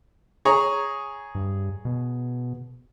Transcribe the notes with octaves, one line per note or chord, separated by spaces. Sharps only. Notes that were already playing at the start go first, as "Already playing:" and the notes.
G#4 C#5 A#5
G2
B2